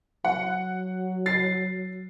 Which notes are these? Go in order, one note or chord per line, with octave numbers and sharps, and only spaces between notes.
F#3 F#5
A6 C7